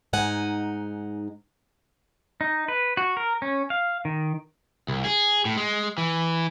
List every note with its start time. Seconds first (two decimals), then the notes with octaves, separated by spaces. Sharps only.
0.13 G#2 D#4 F#5 G#5
2.41 D#4
2.68 B4
2.97 F#4
3.17 A#4
3.42 C#4
3.70 F5
4.05 D#3
4.88 C2
5.05 G#4
5.45 A2
5.57 G#3
5.98 E3